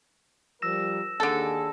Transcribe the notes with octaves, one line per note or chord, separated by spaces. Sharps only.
F3 G3 A#4 E6 A#6 E7
D#2 D3 G#4 A4